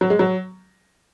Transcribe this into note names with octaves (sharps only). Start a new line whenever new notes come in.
F#3
G#3
F#3